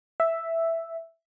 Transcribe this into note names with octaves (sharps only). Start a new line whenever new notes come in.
E5